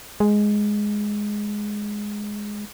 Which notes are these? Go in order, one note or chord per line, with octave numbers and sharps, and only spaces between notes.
G#3